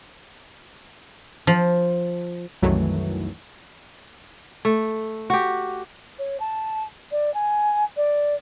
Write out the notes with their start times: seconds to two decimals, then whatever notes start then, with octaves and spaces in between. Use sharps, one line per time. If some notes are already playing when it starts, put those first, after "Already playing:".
1.47 F3
2.62 C2 F#2 D#3 E3 F#3 A3
4.65 A3
5.30 F#4 G4
6.19 C#5
6.40 A5
7.11 D5
7.34 G#5
7.96 D5